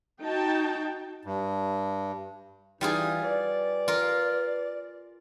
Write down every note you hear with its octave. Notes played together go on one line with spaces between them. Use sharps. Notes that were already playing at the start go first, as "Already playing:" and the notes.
D#4 F#4 G5 A5
G2
E3 G3 D#4 F4 G#4
B4 D5
F4 A#4